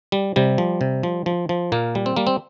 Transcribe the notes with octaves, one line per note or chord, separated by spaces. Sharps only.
G3
C3 G3
F3
C3
F3
F3
F3
A#2 A#3
G3
C4
G3 A#3
C4